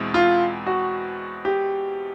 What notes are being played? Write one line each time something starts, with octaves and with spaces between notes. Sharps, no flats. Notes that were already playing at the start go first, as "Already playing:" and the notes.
Already playing: E2 B2 G#3 C4 E4
F4
F#4
G4